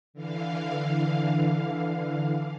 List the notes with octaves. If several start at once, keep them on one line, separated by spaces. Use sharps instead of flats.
D3 E3 F5